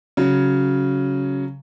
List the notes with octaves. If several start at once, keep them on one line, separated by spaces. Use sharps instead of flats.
C#3 F#3